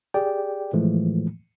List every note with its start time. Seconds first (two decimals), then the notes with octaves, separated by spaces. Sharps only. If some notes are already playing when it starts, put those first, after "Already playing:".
0.14 G4 G#4 D5 G5
0.73 A2 E3 F3 G#3 A3